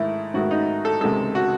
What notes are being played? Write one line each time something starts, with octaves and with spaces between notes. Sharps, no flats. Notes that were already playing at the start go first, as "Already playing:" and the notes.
Already playing: G#2 D#3 A3 E4
G#2 D#3 A3 F#4
D#4
A4
C#2 C3 D#3 G#3 A4
F#4